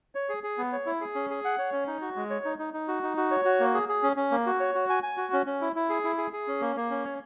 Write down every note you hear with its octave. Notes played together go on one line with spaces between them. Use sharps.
C#5
G#4
G#4
B3
C#5
E4
G#4
C#4
G#4
F#5
C#5
C#4
D#4
F#4
G#3
C#5
D#4
D#4
D#4
F#4
D#4
F#4
C#5
F#4
A#3
G#4
G#4
C#4
C#4
A#3
F#4
C#5
F#4
G#5
G#5
F#4
C#4
C#4
E4
E4
G#4
E4
G#4
G#4
C#4
A#3
A#3
C#4
C#5